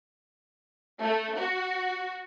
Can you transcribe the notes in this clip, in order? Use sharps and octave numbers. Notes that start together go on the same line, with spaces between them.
A3
F#4